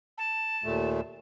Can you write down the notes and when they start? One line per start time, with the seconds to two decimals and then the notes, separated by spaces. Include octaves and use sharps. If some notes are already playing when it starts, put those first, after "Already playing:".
0.18 A5
0.64 D#2 A#2 A3